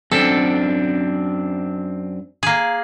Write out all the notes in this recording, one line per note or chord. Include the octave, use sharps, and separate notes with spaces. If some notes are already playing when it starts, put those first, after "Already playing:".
F#2 C4 D4 A4
A#3 G#4